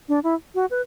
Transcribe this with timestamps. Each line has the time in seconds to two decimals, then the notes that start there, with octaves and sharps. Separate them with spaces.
0.09 D4
0.24 E4
0.55 F#4
0.71 B4